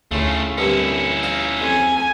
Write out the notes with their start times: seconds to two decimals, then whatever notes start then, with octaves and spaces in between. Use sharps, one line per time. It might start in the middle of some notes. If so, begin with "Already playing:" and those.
0.11 D2 A2 C#3 A3 F4
0.58 C2 G2 D3 C#4 E4
1.23 D#4 F5
1.61 F2 G#5